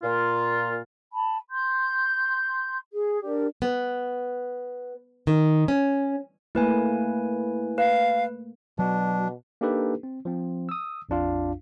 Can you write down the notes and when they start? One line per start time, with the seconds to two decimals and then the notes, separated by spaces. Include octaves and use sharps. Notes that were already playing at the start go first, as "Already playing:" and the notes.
0.03 A#2 F4
1.13 A5 B5
1.51 C6 G6
2.93 G#4
3.24 D4 G4 A#4 D5
3.62 B3
5.27 D#3
5.68 C#4
6.55 A3 A#3 E4 B4 G#5
7.78 B4 F5
8.79 B2 F#3 D4
9.61 A#3 D4 D#4 G4 A4 B4
10.03 C4
10.25 F3 C4
10.69 D#6 E6
11.09 A#1 F2 D4 F4 F5